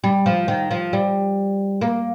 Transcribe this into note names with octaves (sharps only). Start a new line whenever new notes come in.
G3
F3
D#3
F3
G3
A#3